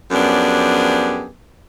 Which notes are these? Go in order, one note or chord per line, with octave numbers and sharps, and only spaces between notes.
F#2 F3 B3 D4 G4 G#4